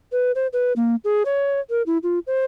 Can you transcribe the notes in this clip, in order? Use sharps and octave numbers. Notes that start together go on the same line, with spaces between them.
B4
C5
B4
A#3
G#4
C#5
A#4
E4
F4
C5